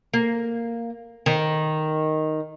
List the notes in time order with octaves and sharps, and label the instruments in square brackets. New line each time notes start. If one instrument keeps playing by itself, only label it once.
[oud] A#3
D#3